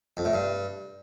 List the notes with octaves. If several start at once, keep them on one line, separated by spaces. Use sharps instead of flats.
F2
A2
G2